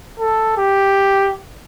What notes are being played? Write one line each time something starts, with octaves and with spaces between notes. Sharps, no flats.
A4
G4